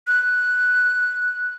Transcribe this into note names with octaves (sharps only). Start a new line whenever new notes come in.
F#6